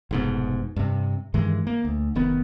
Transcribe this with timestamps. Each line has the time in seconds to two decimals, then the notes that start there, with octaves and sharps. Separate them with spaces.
0.11 F1 G#2 B2
0.76 G2 C3
1.34 G2 D#3 E3 G#3
1.67 A#3
1.85 D2
2.15 F1 D#3 B3